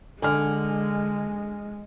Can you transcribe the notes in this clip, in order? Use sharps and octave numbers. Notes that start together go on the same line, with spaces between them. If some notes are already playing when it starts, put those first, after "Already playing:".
D3 G#3 G#5 F6